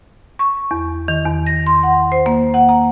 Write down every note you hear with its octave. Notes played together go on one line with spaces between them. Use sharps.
C#6
E2
D#3
E2
A#6
C6
F#5
C5
A#3
F#5
A#5